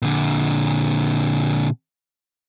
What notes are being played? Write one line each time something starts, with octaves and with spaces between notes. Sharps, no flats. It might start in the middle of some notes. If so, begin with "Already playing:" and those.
A#2 D3